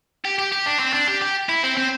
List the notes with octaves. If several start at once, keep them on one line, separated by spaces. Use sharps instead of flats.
G4
G4
G4
D4
C4
D4
G4
G4
E4
C4
C4